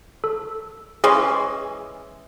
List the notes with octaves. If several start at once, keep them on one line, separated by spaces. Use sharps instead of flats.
A4
E3 G#3 C#4 G#4